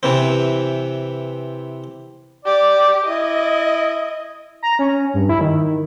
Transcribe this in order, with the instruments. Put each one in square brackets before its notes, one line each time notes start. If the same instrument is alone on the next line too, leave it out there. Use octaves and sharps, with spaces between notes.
[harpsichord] C3 E3 C4
[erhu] G4 [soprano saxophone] D5
[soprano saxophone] E4 [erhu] D#5
[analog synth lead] A#5
C#4
G2
E4
D#3